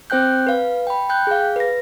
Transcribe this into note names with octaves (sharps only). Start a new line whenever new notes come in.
C4 C5 G5 F#6 G6
B4 F5
G5 B5
G5 F#6 G6
G#4 F5
B4 A#6